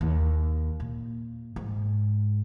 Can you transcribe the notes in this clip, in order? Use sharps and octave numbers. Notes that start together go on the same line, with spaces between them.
D#2
A#2
G#2